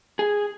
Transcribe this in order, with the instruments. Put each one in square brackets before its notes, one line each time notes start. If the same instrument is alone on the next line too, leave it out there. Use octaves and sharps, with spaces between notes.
[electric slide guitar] G#4